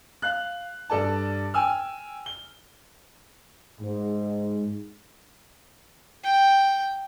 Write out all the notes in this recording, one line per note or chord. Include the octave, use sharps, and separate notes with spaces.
F5 F#6
G2 A4 D5 A5
G5 G#5 E6 F6
G7
G#2
G5